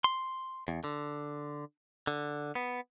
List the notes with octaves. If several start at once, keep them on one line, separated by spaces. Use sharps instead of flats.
C6
E2
D3
D3
B3